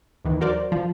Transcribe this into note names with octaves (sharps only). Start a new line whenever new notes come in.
D#2 D#3 E3
F#3 F#4 A#4 C5 D5
F3 F4